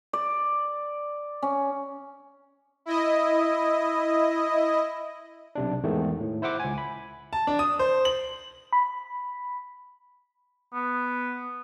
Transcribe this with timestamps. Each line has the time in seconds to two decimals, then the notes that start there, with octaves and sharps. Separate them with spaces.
0.13 D5
1.42 C#4
2.86 E4 D#5
5.55 B1 C3 D4
5.84 E2 G#2 D#3 A3
6.21 A2
6.42 E4 C5 E5 F#5 D6
6.60 C#2 G#5
6.78 B5
7.33 A5
7.47 D4
7.59 D#6
7.79 C5
8.05 F#7
8.73 B5
10.74 B3